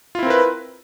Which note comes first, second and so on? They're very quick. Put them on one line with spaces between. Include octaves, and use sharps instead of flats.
F4 E4 C4 A#4 B4